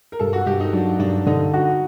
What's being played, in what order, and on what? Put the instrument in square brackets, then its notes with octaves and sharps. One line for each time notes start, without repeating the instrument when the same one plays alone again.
[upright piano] A#4
[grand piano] G2 [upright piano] A4
[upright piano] F#4
[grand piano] G2 [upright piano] G4
[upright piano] D#4
[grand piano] F#3 [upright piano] D4
[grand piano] G2 [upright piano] D4
[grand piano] D3 [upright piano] D#4
[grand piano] F#4